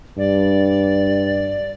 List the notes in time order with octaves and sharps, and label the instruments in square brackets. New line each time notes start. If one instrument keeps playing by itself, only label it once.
[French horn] G2 [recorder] D5